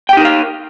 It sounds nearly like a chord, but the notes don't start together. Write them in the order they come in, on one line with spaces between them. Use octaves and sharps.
G5 G4 D#4 A#4 F5